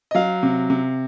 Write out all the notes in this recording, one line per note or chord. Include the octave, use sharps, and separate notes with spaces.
D#5
F#3 F5
C3
C3